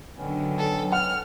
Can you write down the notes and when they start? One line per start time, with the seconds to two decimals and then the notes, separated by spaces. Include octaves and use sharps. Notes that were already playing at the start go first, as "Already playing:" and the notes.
0.17 D3 D#3 F#3 B3 C#4
0.58 A4
0.92 F#5 F6